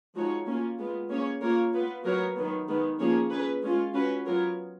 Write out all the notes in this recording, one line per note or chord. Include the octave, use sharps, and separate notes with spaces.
F3 G#3 D#4 F#4 C#5
A#3 C#4 F4
G#3 B3 F4
A#3 C#4 G#4 C#5
A#3 F4 A#4 C#5
B3 F4 B4
F#3 B3 F#4 A#4 C#5
D#3 F#3 B3
D#3 G#3 B3
F3 A#3 C#4 G#4 C#5
C#4 G#4 B4
G#3 C#4 F4
C#4 F#4 B4
F#3 B3 F4 A#4 C#5